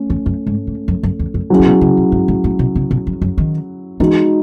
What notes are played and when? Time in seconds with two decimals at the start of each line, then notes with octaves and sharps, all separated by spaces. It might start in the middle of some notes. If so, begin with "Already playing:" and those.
Already playing: A3 C#4
0.10 E2
0.26 F#2
0.46 G#2
0.67 G#2
0.88 F#2
1.03 F#2
1.19 E2
1.34 F#2
1.50 F#3 C#4 E4 G#4
1.59 C#3
1.66 B2
1.81 C#3
1.97 B2
2.12 G#2
2.28 A2
2.44 A2
2.59 B2
2.75 C#3
2.91 B2
3.07 F#2
3.22 F#2
3.38 D#3
4.00 E3 G#3 D#4 F#4